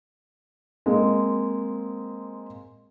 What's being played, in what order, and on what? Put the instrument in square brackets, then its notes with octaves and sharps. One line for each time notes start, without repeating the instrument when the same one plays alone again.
[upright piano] G#3 A#3 C4